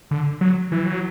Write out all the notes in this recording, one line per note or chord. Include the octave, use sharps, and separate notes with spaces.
D3
F#3
E3
F#3